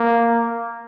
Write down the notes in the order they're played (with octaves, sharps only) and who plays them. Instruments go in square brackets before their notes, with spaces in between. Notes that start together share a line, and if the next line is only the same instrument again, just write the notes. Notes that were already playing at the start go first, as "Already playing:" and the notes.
Already playing: [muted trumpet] A#3